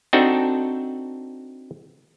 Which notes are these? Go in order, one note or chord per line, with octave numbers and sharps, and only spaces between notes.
C4 D4 D#4 F#4 A4